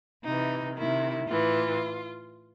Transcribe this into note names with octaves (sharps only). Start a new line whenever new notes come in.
C3 E3 D#4
C3 D#3 E4
A2 E3 F4